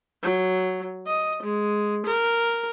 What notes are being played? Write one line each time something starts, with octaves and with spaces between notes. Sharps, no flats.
F#3
D#5
G#3
A#4